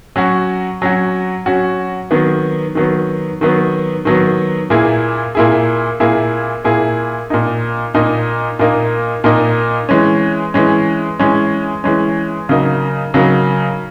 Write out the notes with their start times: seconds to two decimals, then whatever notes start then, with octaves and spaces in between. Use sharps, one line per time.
0.16 F#3 C#4 F#4
0.82 F#3 C#4 F#4
1.46 F#3 C#4 F#4
2.11 D#3 F#3 B3
2.75 D#3 F#3 B3
3.41 D#3 F#3 B3
4.05 D#3 F#3 B3
4.70 A#2 A#3 E4 G#4
5.35 A#2 A#3 E4 G#4
6.00 A#2 A#3 E4 G#4
6.64 A#2 A#3 E4 G#4
7.30 A#2 A#3 D#4
7.94 A#2 A#3 D#4
8.59 A#2 A#3 D#4
9.24 A#2 A#3 D#4
9.89 E3 G#3 C#4
10.54 E3 G#3 C#4
11.19 E3 G#3 C#4
11.84 E3 G#3 C#4
12.49 C#3 F#3 A#3 D#4
13.14 C#3 F#3 A#3 D#4